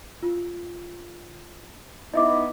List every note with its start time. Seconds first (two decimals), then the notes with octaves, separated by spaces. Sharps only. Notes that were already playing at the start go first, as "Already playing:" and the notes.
0.23 F4
2.14 B3 D#4 E4 D#5 E5 D6